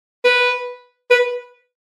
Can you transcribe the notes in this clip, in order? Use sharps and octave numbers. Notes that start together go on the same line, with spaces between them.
B4
B4